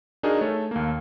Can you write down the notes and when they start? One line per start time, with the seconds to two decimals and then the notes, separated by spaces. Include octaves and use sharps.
0.23 D4 D#4 F#4 G#4 A#4
0.41 A3 A4 C#5
0.71 D#2 A#3